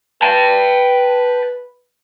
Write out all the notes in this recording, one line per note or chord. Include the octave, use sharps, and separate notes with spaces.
B4 G5 A5